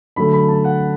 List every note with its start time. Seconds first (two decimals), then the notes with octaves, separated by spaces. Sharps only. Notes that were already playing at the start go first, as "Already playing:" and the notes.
0.16 D3 F#3 A3 B5
0.33 B5
0.48 A5
0.64 F#5